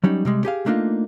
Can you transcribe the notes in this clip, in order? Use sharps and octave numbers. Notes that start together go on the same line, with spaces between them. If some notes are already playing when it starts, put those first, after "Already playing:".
F#3 G3 C#4 D#4
C3 G3 G#3
G4 G#4 F5
A3 A#3 D4 D#4 F4